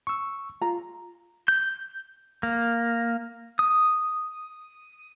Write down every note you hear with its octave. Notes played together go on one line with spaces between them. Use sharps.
C#6 E6
F4 A#5
G6
A#3
D#6